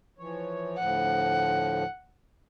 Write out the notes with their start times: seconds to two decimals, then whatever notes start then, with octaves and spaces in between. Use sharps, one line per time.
0.19 E3 F3 C#5
0.78 D2 A2 F3 F#5